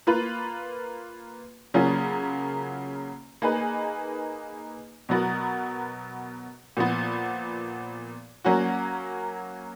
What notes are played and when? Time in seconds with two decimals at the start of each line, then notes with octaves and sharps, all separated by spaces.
0.07 A#3 F4 B4
1.74 C#3 F#3 A#3 C#4 F4
3.42 A#3 D#4 G#4 B4
5.09 B2 F#3 B3 F#4 A#4
6.77 A#2 F3 B3
8.45 F#3 A#3 C#4 F#4